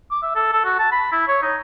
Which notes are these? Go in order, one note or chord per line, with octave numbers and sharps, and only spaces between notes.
D6
E5
A4
A4
F#4
A5
B5
E4
C#5
D#4